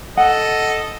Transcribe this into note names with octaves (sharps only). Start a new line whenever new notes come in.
A4 D#5 F#5